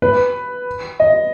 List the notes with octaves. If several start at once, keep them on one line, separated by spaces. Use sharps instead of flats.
B4
D#5